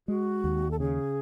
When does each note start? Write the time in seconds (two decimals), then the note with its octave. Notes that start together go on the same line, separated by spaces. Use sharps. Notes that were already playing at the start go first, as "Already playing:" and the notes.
0.08 G#3 F#4
0.44 D#2
0.71 A4
0.79 C#3 G#4